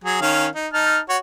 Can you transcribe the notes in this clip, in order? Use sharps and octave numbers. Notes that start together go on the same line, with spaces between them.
F#3 G#4
D#3 C#4 F5
D#4
D#4 A5 F6
F#4 C#5